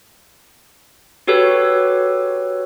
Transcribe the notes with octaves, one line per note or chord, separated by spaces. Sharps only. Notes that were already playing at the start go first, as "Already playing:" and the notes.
F#4 G4 A4 B4 C#5